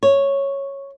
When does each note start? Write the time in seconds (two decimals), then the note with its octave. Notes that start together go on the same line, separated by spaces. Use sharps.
0.03 C#5